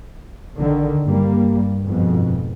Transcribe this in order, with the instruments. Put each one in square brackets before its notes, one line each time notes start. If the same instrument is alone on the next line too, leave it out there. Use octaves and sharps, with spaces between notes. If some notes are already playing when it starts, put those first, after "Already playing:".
[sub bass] A1 [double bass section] D3 D#3
[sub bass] G2 [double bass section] G3 A#3
[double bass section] F2 G#2 B2